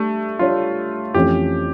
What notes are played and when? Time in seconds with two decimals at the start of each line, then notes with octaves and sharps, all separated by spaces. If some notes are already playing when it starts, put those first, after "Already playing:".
Already playing: G3 A3 D4 G4
0.39 G3 D4 F4 G4 C#5
1.14 F2 E3 A3 C#4 G4